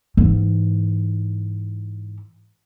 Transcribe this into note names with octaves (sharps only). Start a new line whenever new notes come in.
G#2 E3